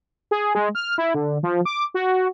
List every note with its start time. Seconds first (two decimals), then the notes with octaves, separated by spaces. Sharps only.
0.31 G#4
0.55 G#3
0.75 F6
0.98 E4
1.15 D3
1.43 F3
1.65 D6
1.94 F#4